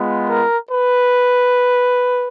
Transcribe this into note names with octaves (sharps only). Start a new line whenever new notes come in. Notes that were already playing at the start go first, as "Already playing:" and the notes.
Already playing: G#3 B3 F4
A#4
B4